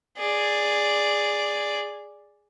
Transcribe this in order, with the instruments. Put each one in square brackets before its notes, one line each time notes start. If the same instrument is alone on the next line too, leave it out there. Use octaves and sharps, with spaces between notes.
[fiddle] G#4 D5